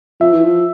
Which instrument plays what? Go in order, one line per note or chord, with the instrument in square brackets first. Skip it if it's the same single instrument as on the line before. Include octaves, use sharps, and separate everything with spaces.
[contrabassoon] F3 [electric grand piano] E5
[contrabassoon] E3
F3